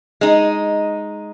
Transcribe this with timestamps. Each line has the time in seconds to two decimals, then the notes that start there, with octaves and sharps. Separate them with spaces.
0.21 G#3 D#4